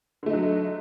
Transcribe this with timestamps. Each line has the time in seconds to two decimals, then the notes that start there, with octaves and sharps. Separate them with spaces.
0.23 D3
0.26 A3
0.30 D#4
0.33 F#3